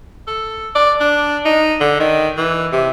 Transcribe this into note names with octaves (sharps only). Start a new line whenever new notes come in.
A4
D5
D4
D#4
D3
D#3
E3
C3